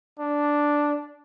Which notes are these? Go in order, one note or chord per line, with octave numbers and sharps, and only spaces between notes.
D4